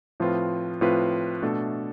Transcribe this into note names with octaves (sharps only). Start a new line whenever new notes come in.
A2 F3 C4 F4 B4
A2 F3 C4 F4 B4
B2 A3 D4 A4